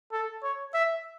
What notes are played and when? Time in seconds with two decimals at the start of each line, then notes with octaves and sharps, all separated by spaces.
0.12 A4
0.43 C#5
0.74 E5